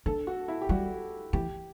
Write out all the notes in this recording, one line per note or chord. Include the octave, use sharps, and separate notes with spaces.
D4 A4
F#4
E4
G4
G3 F#4
E3 G4